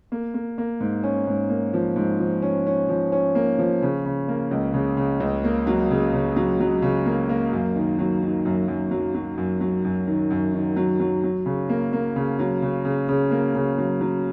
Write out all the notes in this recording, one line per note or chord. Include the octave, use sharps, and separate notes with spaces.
A#3
A#3
A#3
G#2
C#4
G#2
A#3
F3
G#2
F3
C#4
C#4
F3
C#4
A#3
F3
C#3
C#3
A#3
C#2
C#3
C#3
C#2
A#3
F#3
C#3
C#3
F#3
F#3
C#3
A#3
A#3
F#2
D#3
F#3
D#3
F#2
F#2
F#3
F#3
F#2
F#3
F#2
D#3
F#2
D#3
F#3
F#3
F#3
C#3
A#3
A#3
C#3
F#3
C#3
C#3
C#3
A#3
C#3
F#3
F#3